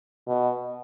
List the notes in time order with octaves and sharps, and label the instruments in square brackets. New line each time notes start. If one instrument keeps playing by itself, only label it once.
[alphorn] B2